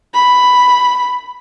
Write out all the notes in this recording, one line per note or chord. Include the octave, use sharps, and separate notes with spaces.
B5